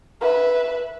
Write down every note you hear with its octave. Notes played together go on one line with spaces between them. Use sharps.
B4 E5